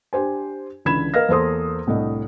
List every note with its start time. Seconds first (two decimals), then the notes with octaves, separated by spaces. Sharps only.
0.13 D4 G4 C5 G#5
0.85 C#2 D3 E3 B5 G#6 E7
1.14 A#4 B4 D#5 F5 F6 A#6
1.29 E2 A#3 A4 C5 C6 D#6
1.87 C2 A2 D4 D#5